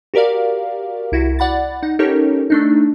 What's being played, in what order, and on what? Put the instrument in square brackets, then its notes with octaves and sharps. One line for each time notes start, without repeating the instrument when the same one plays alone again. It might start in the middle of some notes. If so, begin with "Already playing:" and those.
[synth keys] F#4 G4 A#4 D5 F5
C2 E4 F#4
D5 F#5 B5 A6
D#4 F#5
C#4 D#4 G4 A4 A#4 C#5
A3 D4 D#4